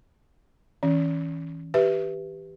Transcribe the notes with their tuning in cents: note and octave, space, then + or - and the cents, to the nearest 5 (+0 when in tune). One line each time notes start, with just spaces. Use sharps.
E3 -30 C#4 +0
G4 +0 B4 +0 E5 +0